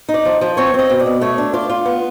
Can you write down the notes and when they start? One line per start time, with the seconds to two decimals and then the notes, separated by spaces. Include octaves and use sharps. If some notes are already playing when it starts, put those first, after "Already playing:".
0.09 D#4
0.14 D5
0.25 F3
0.41 F3
0.57 C4 C#5
0.74 C4 D#5
0.90 B2
1.00 D5
1.06 B2
1.21 A3 C#5
1.38 D4
1.53 F4 D5
1.69 F4
1.86 B3